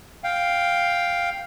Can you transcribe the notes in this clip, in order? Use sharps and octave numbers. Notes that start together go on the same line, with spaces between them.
F5 G5